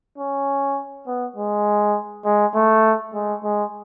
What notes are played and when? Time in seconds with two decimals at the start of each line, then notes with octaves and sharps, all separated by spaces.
0.18 C#4
1.07 B3
1.36 G#3
2.25 G#3
2.55 A3
3.14 G#3
3.43 G#3